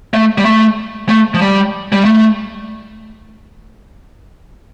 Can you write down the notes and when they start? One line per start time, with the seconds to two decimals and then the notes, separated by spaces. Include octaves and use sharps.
0.14 A3
0.38 G3
0.45 A3
1.09 A3
1.34 F3
1.41 G3
1.92 G3
2.05 A3